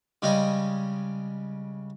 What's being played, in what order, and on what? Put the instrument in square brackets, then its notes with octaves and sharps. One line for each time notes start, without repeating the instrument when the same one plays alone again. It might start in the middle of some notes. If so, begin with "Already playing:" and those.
[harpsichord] C#3 G3 G#3 D#5